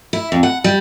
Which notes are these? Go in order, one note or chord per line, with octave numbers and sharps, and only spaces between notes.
E4
F2
F#5
G3